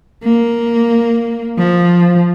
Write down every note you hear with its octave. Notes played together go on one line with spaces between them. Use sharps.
A#3
F3